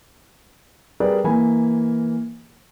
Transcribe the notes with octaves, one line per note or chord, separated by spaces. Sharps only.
G3 G#4 A#4 B4 D5
E3 A#3 G#5 B5